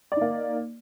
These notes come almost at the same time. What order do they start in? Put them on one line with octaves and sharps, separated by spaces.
D5 D#4 A#3